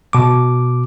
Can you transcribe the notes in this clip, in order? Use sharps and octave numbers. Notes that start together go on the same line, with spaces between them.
B2 D6